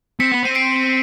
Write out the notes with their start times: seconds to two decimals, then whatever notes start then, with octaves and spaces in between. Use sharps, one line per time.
0.20 C4 B6 C#7
0.32 B3
0.43 C4 D#7
0.55 C7 D7